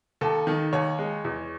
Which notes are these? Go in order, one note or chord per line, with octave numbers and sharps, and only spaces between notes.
D#2 A4
D#3
D#2 C#5
G#3
E2